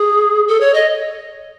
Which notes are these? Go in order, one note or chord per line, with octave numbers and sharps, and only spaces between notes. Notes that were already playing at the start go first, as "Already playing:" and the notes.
Already playing: G#4
A4
C#5
D#5